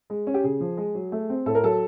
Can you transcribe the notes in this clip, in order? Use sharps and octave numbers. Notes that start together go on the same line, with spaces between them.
G#3
C#4
G4
C#3 G#4
F3
G#3
F#3
A3
C4
A2 A4
A#4
F#3 A4